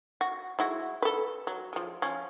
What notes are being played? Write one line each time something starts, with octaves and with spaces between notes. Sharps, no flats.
F#4
G#3 E4 F#4
A4 B4
F#3
F3 G#3
F3 C#4